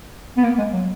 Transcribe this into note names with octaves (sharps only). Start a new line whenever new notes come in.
B3
A#3
G#3
F#3